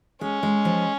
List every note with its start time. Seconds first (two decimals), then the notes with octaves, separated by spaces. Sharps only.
0.21 G#3 C#4
0.43 G#3
0.65 F3